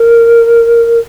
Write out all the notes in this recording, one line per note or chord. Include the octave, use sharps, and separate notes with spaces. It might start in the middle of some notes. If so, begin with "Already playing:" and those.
Already playing: A#4